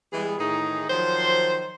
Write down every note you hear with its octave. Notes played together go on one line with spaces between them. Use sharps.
E3 G3 G#3 B3 E4 G#4
A2 D#3 E3 D#4 G#4
D#3 F3 F#3 C5